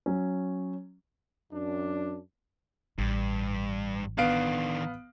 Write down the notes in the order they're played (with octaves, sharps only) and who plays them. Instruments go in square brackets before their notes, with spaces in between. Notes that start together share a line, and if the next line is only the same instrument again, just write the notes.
[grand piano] F#3 C#4
[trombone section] F#2 D4
[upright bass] A1 [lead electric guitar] G2
[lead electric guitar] D#3 D4 [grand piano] B3 F5 D7